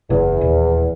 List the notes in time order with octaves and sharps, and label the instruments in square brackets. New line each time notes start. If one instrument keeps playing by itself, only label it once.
[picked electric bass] F#1 C#3 [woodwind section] E2
[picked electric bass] D#1